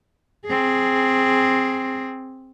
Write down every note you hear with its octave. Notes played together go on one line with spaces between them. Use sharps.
C4 G#4